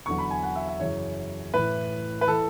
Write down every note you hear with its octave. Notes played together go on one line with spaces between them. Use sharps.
E2 D3 F#3 C#6
B5
G#5
F#5
E5
E5
F#2 C#3 E3 C#5
A2 E3 B4
B4
E3 A4